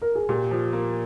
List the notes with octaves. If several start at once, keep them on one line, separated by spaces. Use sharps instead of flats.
A#4
G#4
A#2 G4
F3
A#3